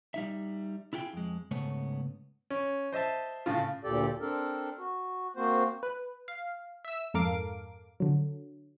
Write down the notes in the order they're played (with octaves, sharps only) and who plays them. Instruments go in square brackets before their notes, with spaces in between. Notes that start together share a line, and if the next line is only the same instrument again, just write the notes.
[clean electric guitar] G3 D#4 E5
E4 F4 G#4 F#5 G5
F2 G#3
G#2 C#3 A3 B3 C#5
[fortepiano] C#4
C5 D#5 E5 A5
A2 C#3 F4
[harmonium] D2 A#2 G4 A4 D5
C4 D4 A4 A#4
F#4
A#3 C4 F#4 C5
[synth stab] B4
F5
E5 E6
F2 G#2 A4 A#4 F5 D6
D3 F#3